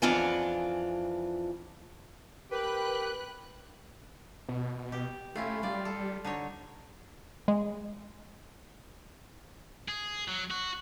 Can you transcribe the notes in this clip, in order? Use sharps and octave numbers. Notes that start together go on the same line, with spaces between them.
F2 E3 D4 F4 F#5 G#5
G4 A#4 B4 G5 F#6
B2
G4
A3 C#4 E4 F4
G3 F4 D5
A4
D3 D#4 C#5
G#3
G#4
F#3
F#4